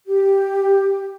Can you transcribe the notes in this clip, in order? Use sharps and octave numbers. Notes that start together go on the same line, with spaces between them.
G4